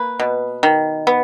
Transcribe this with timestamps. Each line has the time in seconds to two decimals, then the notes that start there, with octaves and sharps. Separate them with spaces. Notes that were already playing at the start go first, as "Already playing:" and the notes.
Already playing: A#3 B4
0.20 B2
0.63 D#3
1.07 B3